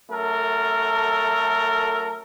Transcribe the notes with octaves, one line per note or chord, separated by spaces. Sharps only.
F#2 A3 A4 A#4